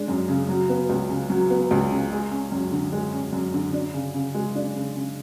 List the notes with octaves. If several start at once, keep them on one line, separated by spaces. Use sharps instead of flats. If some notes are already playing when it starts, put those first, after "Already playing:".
Already playing: G#3 D4
F#2
C#3
F#3
B3
C#2
C#3
F#3
B3
C#2
C#3
G#3
C#4
F#2
D3
G#3
C#4
F#2
D3
D4
C#3
C#3
G#3
D4
C#3
C#3